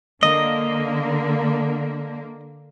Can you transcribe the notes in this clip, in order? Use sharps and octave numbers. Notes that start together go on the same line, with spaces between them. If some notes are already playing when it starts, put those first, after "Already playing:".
D3 A#3 D#5